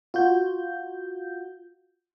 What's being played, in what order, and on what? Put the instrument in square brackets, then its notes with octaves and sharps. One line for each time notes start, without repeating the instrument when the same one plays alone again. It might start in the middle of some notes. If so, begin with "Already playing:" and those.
[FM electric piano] F4 F#4 G6